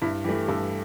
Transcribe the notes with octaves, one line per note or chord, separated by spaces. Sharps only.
G2 E4
E3 A3 G4
G2 A4